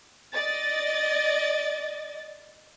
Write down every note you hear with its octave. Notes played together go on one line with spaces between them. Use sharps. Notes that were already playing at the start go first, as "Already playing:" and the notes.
D5 D#5 A6